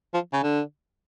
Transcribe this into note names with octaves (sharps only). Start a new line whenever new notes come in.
F3
C#3
D3